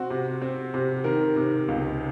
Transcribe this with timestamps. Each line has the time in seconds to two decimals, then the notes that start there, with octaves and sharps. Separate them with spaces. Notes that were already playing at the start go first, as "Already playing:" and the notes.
Already playing: C4 F#4
0.10 C3
0.42 C4
0.74 C3
1.04 D#3 A#4
1.36 C3
1.68 C#2